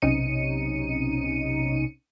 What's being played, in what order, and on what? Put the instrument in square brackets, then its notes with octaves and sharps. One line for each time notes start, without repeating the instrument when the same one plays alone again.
[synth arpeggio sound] B1 C3 C#4 D#4 C#7 D#7